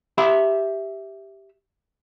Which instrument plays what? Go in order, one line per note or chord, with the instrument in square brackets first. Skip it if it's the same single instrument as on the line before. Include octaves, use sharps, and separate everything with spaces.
[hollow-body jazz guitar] G4 E5 B5